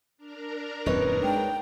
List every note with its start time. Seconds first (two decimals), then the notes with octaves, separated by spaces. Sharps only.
0.17 D4 A#4 A#5
0.86 D#1 F#2 C4 D#4 B4 C#5
1.24 G#3 G5